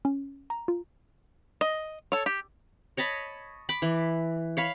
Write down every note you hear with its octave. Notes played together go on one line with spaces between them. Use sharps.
C#4
A#5
F4
D#5
A4 C#5
G4
C#5 D#5 A5 B5
B5 D6
E3
C#5 F5 B5